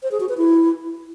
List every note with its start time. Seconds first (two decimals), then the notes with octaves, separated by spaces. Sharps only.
0.03 C5
0.12 G#4
0.20 F#4
0.29 B4
0.38 E4